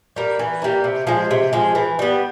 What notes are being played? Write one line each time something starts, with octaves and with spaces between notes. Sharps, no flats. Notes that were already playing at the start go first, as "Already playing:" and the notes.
G3 A#3
E3
G3 A#3
C3
F3 G#3
C3
F3 G#3
E3
G3 B3